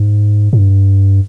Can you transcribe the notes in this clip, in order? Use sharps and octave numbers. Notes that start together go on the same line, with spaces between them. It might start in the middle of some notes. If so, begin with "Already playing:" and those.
Already playing: G#2
G#2
G2